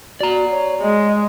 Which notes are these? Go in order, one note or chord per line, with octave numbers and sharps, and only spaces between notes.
F#4 D5 A#5
C#5
G#3 D#5